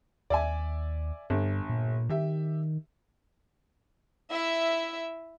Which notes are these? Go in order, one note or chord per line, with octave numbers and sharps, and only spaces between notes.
D#2 D5 E5 G#5
G1 G2
A#2
D#3 G4 E5
E4 E5